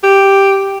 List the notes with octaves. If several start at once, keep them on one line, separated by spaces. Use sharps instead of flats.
G4